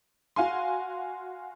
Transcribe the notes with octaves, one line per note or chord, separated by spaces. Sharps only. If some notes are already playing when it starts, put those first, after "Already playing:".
F#4 F5 G#5 C6